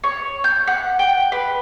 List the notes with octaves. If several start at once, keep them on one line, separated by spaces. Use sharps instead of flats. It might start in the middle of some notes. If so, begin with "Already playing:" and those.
C#5
G6
F#5
G5
B4